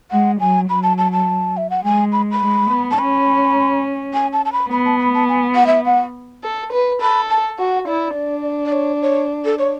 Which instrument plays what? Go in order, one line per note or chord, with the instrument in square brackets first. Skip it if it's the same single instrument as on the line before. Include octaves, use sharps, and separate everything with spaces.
[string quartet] G#3 [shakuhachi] F#5
[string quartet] F#3 [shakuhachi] G#5
[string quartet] F#3 [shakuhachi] B5
[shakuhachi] A5
A5
A5
E5
F#5
[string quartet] G#3 [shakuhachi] G#5
[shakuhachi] B5
B5
[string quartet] G#3
B3
[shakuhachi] A5
[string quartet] C#4 [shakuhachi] B5
[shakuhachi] G#5
A5
A5
B5
[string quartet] B3 [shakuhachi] B5
[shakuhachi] A5
B5
A5
G#5
F#5
E5
F#5
[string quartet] A4
B4
[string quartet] A4 [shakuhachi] B5
[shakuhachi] A5
[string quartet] F#4 [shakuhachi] F#5
[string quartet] E4 [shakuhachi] D5
[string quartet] D4
[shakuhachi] D5
C#5
C#5
A4
C#5